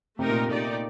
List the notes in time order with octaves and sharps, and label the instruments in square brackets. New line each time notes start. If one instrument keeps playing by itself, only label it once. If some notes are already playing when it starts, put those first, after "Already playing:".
[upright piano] C3 [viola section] A3 D#4 G4 A#4
[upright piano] A#2
[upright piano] A#2 [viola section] A3 D#4 G4 D5